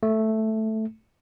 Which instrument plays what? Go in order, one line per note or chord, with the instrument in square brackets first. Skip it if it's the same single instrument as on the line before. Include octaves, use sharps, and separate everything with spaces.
[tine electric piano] A3